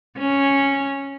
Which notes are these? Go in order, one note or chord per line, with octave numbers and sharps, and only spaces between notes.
C#4